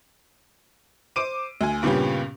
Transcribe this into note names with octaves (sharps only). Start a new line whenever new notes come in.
C5 D6 D7 D#7
D2 G#5
G2 A#2 C#3 B3 C#4 G4